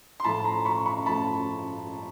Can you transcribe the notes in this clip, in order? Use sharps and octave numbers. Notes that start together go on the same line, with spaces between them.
C6
A2 F3 A3 A5 B5
A#5 C6
B5 C#6
B5 C#6
A2 F3 A3 A5 B5